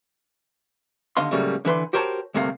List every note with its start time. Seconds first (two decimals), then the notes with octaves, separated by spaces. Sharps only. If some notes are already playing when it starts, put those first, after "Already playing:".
1.17 D#2 D3 D#5 F5 C6
1.31 A2 C#3 F#3 G3 A3 A#3
1.65 D3 E3 B4 C6
1.93 F#4 G4 A#4 C5 C#5 A5
2.34 D2 G2 C3 A3 A#3 F5